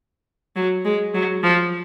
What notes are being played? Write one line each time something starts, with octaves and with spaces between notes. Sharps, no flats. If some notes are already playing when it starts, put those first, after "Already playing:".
F#3
G#3
F#3
F3